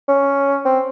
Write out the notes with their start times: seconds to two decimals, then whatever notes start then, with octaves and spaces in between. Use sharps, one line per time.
0.08 C#4
0.65 C4